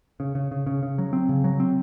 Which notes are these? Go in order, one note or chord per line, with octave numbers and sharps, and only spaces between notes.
C#3
C#3
C#3
C#3
C#3
F#3
C4
C#3
F#3
C4